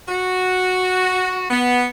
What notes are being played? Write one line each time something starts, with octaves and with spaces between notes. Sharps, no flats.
F#4
B3